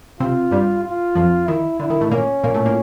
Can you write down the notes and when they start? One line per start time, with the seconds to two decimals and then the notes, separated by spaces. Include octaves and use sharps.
0.20 C3 C4 F4
0.51 G2 G3
0.83 F4
1.15 F2 F3
1.47 D#3 E4
1.79 D3 E4
1.90 D#3
2.01 A2 A3
2.11 A#2 A#3 C#4
2.43 A#2 A#3
2.54 A2 A3
2.65 A#2 A#3